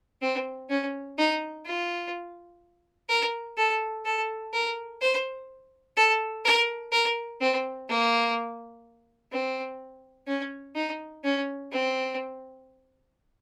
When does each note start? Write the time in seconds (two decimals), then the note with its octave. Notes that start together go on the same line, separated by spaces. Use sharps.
0.22 C4
0.70 C#4
1.18 D#4
1.66 F4
3.09 A#4
3.57 A4
4.05 A4
4.53 A#4
5.01 C5
5.97 A4
6.45 A#4
6.92 A#4
7.41 C4
7.89 A#3
9.32 C4
10.27 C#4
10.76 D#4
11.24 C#4
11.72 C4